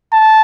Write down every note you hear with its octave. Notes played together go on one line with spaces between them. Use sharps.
A5